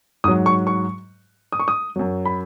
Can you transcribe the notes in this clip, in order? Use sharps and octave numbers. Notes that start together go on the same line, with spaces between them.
G#2 F#3 D#6
C#6
C#6
D#6
C#6
D#6
F#2 F#3
B5